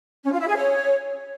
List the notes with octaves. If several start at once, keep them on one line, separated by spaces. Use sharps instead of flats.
C#4
F4
E4
G#4
C#5